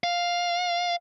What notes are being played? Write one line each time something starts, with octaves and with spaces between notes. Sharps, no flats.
F5